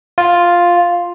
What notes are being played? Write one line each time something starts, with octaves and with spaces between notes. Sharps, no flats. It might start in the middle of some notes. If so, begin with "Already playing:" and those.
F4